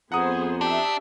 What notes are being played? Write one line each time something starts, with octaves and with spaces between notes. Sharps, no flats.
F2 B3 G#4 C5 F#5 A#5 D#6
D4 G4 E5